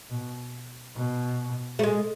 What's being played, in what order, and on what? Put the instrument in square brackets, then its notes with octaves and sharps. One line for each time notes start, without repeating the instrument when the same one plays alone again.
[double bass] B2
B2
[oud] A3
G#3